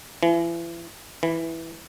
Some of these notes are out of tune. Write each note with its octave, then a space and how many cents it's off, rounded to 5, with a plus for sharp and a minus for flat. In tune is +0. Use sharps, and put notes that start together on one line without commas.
E3 +35
E3 -5